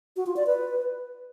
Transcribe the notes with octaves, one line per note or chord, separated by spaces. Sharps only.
F#4
F4
D5
B4